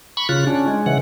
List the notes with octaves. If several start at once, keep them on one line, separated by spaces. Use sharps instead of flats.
B5 C#6
C#3 F4 F#6
C#4 D4
G#3
C#3 E3 F#5